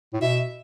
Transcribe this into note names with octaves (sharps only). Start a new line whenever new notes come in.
A2
B2 E5